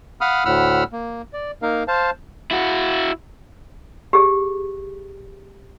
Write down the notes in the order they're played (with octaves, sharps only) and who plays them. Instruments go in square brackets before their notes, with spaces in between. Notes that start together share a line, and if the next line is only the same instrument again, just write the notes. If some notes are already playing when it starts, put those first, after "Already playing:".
[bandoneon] F5 F#5 B5 D#6 F6
D2 A2 F#5 B5 E6 F6
A#3
D5
A#3 D#4 A#4 F5
C5 F5 A5
[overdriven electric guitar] E4 F#4
[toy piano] G4 G#4